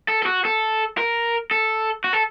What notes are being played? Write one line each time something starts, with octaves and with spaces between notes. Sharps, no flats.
A4
A4
F#4
A4
A#4
A4
F#4
A4